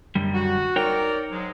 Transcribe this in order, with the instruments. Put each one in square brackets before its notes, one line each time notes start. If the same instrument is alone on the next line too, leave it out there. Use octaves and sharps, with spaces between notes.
[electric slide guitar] F#2 D3 G3
[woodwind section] F#4
[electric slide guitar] D#4 C#5 G5 [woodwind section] A#4 D5
[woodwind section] G#2 F#3 G#3